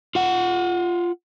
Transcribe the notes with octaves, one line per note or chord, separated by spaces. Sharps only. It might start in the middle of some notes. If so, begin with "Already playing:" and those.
F4 F#5